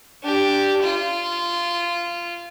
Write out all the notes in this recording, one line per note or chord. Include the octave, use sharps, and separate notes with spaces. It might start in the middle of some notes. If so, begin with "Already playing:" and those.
D4 G4
F4